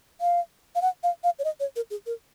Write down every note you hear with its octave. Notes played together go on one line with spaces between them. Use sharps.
F5
F5
F#5
F5
F5
C#5
D#5
C#5
A#4
G#4
A#4